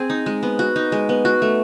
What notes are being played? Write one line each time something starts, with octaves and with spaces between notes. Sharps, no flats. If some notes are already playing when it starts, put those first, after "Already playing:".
Already playing: C4 G#4
D#4
G#3
B3
F#4
D#4
G#3
B3
F#4
A3